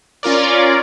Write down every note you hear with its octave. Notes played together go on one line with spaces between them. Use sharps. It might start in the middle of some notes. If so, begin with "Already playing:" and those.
C#4 F4 A#4 D5